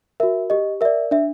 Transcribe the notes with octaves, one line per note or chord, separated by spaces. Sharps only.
F#4 A#4 E5
G4 D#5
A#4 D5 E5
D4 E5